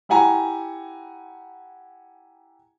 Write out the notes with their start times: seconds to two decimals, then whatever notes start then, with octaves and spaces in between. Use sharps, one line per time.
0.09 E4 G4 F#5 G#5 A#5